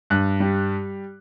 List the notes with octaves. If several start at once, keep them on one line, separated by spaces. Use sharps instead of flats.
G2 F#6
G3